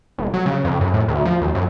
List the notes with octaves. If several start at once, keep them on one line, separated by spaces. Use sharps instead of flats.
E1
F#3
C#3
F2
F#2
A2
D2
F3
D#2
F#2